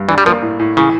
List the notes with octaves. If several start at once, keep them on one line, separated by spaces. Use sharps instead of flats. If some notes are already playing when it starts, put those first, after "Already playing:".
Already playing: G2
E3 D4
G3
F3 A#3
A2
A2
C#3 E3